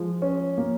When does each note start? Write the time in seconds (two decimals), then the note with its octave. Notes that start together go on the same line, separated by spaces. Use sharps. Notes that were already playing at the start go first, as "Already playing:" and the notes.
Already playing: F3 G#3
0.22 C#4
0.58 A#3